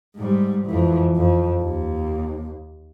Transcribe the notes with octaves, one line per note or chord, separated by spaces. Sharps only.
G#2 G3
F2 E3
F2
D#2